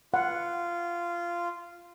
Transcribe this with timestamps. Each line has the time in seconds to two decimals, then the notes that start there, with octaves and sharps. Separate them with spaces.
0.14 F4 F#5